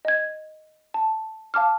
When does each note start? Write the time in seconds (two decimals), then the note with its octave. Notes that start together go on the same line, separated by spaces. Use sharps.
0.05 D#5 G#6
0.94 A5
1.54 F5 A5 D6 F6